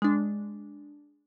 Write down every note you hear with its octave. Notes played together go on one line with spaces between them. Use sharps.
G#3 D4